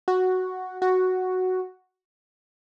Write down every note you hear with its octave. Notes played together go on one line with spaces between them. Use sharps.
F#4
F#4